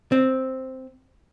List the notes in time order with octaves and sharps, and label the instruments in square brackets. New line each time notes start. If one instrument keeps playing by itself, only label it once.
[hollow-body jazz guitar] C4